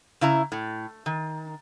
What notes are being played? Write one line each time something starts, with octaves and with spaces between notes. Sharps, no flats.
C#3 E4 A#5
A2
D#3